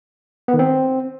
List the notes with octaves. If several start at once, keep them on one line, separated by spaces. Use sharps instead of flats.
B3
D#3
C4